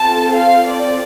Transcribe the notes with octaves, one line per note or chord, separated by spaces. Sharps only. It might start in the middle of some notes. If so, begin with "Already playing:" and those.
Already playing: C4 F4 A4 A5
F5
D5